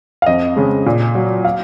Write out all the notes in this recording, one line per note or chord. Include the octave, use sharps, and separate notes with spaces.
F5
F2 D#5
C#3 G#3
A#2
F#3
F5